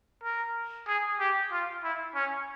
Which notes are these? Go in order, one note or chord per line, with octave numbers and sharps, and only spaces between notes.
A#4
G#4
G4
F4
E4
C#4